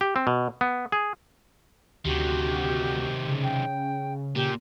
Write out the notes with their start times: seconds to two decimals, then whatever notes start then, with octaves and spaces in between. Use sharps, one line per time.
0.01 G4
0.16 C4
0.27 B2
0.61 B3
0.92 G#4
2.05 D2 C3 D#3 F#4 G4
3.27 C#3
3.43 G5
4.36 A#2 G4